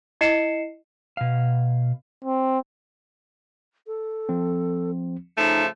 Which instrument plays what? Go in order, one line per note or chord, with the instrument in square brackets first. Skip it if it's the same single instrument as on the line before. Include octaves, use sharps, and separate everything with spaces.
[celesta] E4 D#5 C7 C#7 E7
[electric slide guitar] B2 F5
[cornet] C4
[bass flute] A4
[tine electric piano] F3 C4
[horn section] C#3 F3 A3 [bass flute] D#4